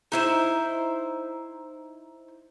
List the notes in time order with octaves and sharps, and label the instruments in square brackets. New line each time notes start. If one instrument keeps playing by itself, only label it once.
[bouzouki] D#4 E4 C5